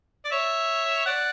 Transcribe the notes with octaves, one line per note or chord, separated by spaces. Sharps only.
D5
C#5 E5
D5 F#5